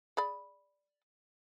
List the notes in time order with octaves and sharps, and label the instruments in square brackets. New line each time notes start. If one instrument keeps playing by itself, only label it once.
[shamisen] G#4 D5 B5